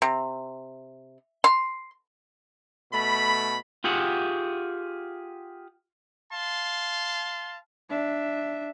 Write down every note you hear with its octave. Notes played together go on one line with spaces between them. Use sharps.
C3
C6
B2 A3 B5
F4 G4 G#4 F#5
F5 A5 C6
D4 E5